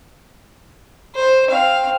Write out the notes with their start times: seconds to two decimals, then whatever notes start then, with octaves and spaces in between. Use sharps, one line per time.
1.15 C5
1.48 C4 F5